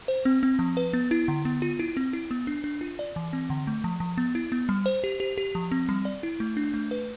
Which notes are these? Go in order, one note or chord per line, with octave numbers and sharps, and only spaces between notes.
C5
C4
C4
F3
B4
B3
E4
D3
B3
F4
E4
C4
E4
B3
D4
D4
F4
D5
E3
C4
D3
A3
F3
F3
B3
E4
B3
G3
C5
G4
G4
G4
F3
C4
G3
D5
E4
A3
D4
A3
B4